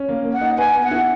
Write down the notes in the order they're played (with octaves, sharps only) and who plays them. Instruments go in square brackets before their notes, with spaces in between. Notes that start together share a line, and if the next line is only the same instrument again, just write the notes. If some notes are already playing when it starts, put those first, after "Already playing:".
Already playing: [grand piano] C#4
A#3
A#3
[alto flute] F#5
[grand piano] D#4
[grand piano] B4 [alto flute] G#5
[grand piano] B3
[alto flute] F#5
[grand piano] E4